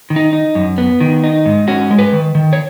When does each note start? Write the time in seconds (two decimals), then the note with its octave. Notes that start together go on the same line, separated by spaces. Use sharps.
0.10 D#3
0.16 D#4
0.33 D#4
0.55 F#2
0.78 B3
1.01 D#3
1.24 D#4
1.46 G#2
1.68 C#4 F#4
1.91 G#3
1.99 B4
2.13 D#3
2.35 D#3
2.53 C#5